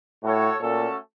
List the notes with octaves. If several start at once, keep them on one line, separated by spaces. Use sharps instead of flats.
A2 F#4 A4 C#5
A#2 A3 C#4 F#4 A4